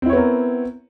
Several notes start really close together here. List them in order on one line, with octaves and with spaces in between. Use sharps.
C4 E4 C#5 B3 A#4